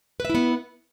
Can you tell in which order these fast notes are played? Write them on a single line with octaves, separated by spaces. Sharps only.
B4 E5 E4 B3